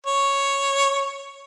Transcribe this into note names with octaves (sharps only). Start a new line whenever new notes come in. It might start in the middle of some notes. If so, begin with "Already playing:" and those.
C#5